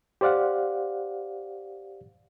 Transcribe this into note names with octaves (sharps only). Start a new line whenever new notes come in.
G4 C5 D5 F5 F#5